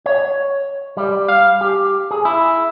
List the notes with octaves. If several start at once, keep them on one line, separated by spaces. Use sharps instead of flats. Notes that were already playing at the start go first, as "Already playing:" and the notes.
C#5
G3
F5
G4
G#4
E4